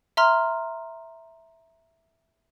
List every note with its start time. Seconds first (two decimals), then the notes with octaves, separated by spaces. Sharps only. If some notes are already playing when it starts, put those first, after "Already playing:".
0.17 E5 A#5 C6 F6